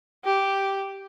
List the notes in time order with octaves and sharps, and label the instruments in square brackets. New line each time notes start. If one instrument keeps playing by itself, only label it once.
[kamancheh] G4